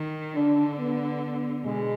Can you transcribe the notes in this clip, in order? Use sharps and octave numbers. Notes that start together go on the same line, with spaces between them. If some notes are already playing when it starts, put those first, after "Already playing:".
Already playing: D#3
D3 D4
B3
B2 G#3